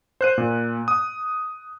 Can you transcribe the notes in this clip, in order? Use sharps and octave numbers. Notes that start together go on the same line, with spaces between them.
C5 F#6 D#7
A#2
D#6